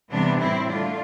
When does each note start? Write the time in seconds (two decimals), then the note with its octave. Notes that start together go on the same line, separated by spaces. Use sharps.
0.11 C3 E3 G3 B3 D4
0.39 A2 G3 C4 E4
0.67 D3 A3 D4 F4